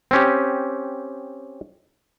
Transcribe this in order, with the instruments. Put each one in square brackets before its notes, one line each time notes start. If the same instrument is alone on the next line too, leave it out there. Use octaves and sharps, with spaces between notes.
[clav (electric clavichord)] C4 C#4 G4